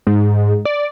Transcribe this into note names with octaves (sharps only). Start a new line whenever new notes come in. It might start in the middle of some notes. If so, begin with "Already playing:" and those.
G#2
D5